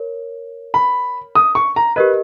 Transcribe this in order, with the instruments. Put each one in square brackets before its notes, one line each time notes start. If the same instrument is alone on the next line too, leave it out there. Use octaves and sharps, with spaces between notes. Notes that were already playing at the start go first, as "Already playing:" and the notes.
Already playing: [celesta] A#4 C#5
[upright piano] B5
D#6
C#6
A#5
[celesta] G4 A#4 D#5 [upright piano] B4